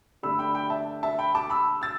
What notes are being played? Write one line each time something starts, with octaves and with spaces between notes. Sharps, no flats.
G2 D3 A3 D4 B5 E6
G5 B5
G5 B5
E5 A5
E5 A5
G5 B5
A5 D6
B5 E6
E6 A6